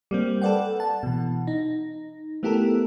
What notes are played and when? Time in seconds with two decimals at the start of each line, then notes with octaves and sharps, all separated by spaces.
0.11 G3 A#3 C4
0.42 A4 B4 D5 F#5 G5
0.80 F#5 A5
1.03 B2 E3
1.47 D#4
2.43 A3 B3 E4 G4 A4 A#4